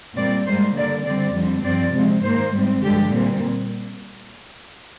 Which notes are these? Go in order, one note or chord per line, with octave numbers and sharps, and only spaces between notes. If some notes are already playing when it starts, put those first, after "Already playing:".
A#2 G3 C4 D5
G#2 G3 A#3 C5
D3 G3 A#3 D5
D3 G3 C4 D5
F2 D3 G3 C4
G2 F3 C4 D5
C3 F3 G#3 C4
G#2 D#3 A#3 C5
G#2 G3 C4
G2 D3 F3 G#3 G4
A#2 G3 C4